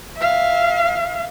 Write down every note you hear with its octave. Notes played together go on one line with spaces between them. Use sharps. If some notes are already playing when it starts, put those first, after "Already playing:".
E5 F5